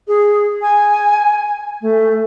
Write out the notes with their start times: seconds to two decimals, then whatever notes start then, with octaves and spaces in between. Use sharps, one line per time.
0.07 G#4
0.62 G#5
1.81 A3